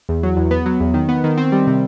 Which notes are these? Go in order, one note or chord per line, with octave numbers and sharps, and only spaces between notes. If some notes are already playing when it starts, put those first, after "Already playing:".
E2
F#3
E2
B3
F#3
E2
D#3
B3
D#3
C4
G3
C3